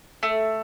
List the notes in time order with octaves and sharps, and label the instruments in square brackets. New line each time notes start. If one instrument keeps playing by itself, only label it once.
[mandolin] A3